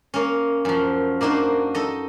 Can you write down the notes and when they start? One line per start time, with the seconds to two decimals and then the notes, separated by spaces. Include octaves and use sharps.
0.14 A#3 C#4
0.65 F#2 F3
1.21 A#3 D4 D#4 F#4 C5
1.75 D#4 A4 D#5